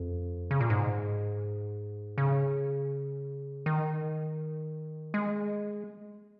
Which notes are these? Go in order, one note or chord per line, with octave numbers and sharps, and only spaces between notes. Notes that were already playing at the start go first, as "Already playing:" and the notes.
Already playing: F2
C#3
A#2
G#2
C#3
D#3
G#3